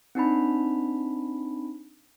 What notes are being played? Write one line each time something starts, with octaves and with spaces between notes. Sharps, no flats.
C4 D4 D#4 B5